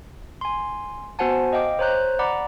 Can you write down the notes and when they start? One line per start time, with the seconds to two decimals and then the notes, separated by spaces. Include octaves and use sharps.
0.41 G#5 C6
1.19 B3 F#4 C5 F#5 G#5 A5
1.53 D#5 F5 G5 D6
1.79 C5 C#5 A#5 F#6 G6
2.19 D5 F#5 A#5 B5 D6